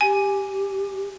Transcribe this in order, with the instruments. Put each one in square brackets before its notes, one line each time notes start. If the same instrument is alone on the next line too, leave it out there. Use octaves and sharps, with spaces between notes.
[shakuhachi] G4 [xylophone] G#5